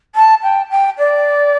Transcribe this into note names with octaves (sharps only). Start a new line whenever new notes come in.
A5
G5
G5
D5